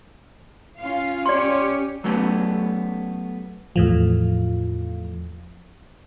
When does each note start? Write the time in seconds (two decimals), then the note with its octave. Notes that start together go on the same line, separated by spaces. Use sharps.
0.78 C#4 F4 F5
1.26 C#4 G4 C#5 D5 C6
2.04 F#3 A3 B3 C#4 G4
3.76 E2 A2 F3